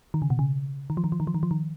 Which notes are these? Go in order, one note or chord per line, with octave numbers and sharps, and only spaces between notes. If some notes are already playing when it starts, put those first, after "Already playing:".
D#3
C#3
B2
C#3
D#3
F3
D#3
F3
D#3
F3
D#3
F3
D#3